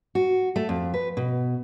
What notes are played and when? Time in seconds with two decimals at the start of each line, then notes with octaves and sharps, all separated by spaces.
0.15 F#4
0.56 A3
0.69 F2
0.94 B4
1.17 B2